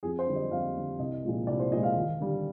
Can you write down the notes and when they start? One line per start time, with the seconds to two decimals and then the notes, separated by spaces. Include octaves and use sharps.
0.03 F2 G#4
0.19 C5
0.27 D3 G3
0.36 D#5
0.51 F2 F5
0.76 D3 G3
0.99 C2 D#5
1.23 A#2 F3 G#3
1.47 C2 D5
1.59 C5
1.72 A#2 F3 G#3 D#5
1.83 F5
1.96 D#2
2.20 D3 G3